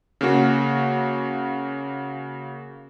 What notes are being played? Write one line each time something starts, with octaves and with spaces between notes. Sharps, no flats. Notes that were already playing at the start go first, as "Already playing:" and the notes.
C#3 A#3 F#4